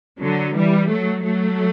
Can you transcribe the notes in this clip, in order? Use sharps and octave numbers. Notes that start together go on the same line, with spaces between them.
D3 F#3
E3 G3
F#3 A3
F#3 A3